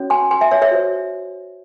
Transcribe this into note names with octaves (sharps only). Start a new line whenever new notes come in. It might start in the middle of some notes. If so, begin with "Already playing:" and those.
Already playing: C#4 F#4 C#5
G#5 C6
G#5 C6
E5 G#5
C#5 E5
C#5 E5
F#4 C5